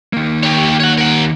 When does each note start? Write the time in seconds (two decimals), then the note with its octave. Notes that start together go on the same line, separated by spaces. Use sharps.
0.13 D#3 A#3
0.43 G4 C#5
0.80 C#5 F#5
0.98 A#4 F#5